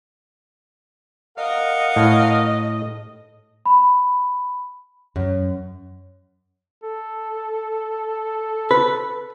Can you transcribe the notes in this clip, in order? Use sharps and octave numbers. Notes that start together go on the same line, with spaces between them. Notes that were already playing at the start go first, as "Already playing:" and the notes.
A#4 D#5 F5 F#5
A2
B5
F#2
A4
B4